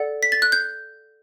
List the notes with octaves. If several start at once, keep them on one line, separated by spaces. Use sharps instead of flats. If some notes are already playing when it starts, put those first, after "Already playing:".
Already playing: A4 D5 F#5
B6
A6
F#6
G6